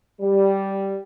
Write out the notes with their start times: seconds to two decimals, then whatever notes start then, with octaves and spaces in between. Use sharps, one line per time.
0.21 G3